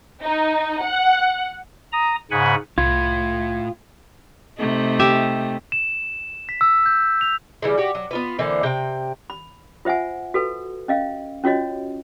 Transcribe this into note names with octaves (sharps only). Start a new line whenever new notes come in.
D#4
F#5
A#5 D#6
G#2 C#3 F#5 G#5 B5
C2 A2 F4 G#6
C3 A3 D#4
G4 E5
E7
B6
E6
G6
F7
C#3 E3 G3
F#4 G4
F#3
B3 F4 B4
D3 E3 A#3 C4
C3 G5
B5
F4 C5 E5 F#5 G#5
F#4 A4 B4
C#4 D#5 F5
C#4 F4 F#4 C#5 D#5